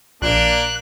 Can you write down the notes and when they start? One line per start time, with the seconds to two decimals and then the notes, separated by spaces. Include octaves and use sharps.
0.22 A#1 A#3 D4 F#6